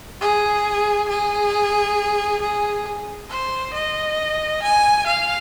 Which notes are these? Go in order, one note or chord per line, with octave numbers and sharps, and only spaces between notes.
G#4
G#4
G#4
C5
D#5
G#5
F5